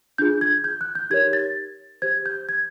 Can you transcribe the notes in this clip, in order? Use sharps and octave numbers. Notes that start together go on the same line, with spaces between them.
D4 F4 G#4 G6
G#6
G6
F#6
G6
D#4 G4 A#4 C#5 G#6
A6
G4 C5 G#6
G6
G#6